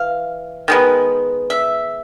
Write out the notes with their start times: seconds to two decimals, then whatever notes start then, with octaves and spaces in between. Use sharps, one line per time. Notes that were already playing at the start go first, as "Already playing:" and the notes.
Already playing: E3 F5
0.68 D#3 G#3 B3
1.50 E5